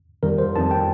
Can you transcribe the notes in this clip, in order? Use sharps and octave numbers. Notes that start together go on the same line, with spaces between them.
F2 D#3 G3 A#4
C5
F2 D#3 G3 A5
G5